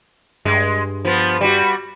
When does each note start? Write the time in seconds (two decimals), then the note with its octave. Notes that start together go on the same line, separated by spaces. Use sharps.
0.45 G2 G#3
1.05 F3 B3
1.41 G3 F#4